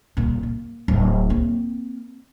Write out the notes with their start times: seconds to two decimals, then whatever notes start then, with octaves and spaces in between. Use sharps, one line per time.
0.17 D#1 A#2
0.43 A#3
0.88 D1
1.30 A#3 C4